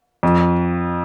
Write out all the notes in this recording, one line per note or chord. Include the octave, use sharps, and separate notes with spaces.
F2